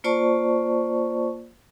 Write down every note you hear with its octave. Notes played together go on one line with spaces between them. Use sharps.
A#3 F4 C5 D5 A5 C#6